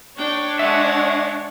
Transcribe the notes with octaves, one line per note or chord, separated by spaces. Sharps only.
D4 C#5 G5
G#3 E5 F#5